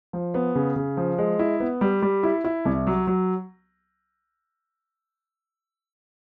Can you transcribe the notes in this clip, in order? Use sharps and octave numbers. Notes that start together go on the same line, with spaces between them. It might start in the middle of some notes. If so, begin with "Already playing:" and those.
F3
B3
C#3
C#3
F3
G#3
E4
B3
G3
G3
E4
E4
C2
F#3
F#3